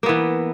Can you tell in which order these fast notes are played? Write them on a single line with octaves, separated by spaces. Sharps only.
A#3 B3 E3